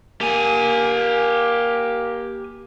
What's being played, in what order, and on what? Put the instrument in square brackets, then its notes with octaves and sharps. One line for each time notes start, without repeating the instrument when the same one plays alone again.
[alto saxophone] A#3 [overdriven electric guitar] G4 G#5